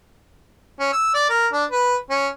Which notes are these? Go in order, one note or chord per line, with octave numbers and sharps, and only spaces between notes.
C#4
E6
D5
A#4
D4
B4
C#4